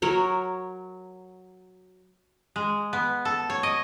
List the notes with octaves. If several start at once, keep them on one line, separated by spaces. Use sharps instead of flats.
F#3 A#4 C#5
G#3
B3
A4
C#5
D#5